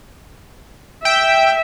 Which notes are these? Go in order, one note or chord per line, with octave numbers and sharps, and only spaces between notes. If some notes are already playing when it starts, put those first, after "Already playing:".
E5 G5